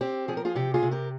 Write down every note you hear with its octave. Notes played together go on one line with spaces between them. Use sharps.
C4 G4
F3 G#4
A#4
F4 G#4
C3 G4
F4 G#4
C3
G4 A#4